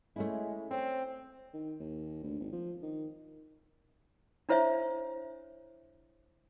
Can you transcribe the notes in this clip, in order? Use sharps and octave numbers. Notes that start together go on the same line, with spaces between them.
G#3 A3 C#4 E4
C4 C#5
D#3
D#2
D2
G#1
F3
D#3
D4 E4 C5 C#5 E5